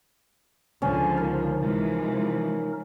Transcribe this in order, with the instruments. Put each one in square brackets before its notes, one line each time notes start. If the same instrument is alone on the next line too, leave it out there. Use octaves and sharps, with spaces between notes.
[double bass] C#2 F3 [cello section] D3 [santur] C#4
[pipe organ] D#4 A#4
[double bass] C3 F3 [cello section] E3 G#3